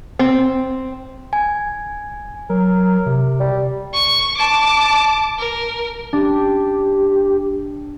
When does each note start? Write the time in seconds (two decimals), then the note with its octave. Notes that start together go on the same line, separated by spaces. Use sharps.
0.19 C4
1.33 G#5
2.50 F#3 A#4
3.06 C3
3.40 G3
3.94 C#6
4.38 A5 D6
5.39 A#4
6.13 D4 G4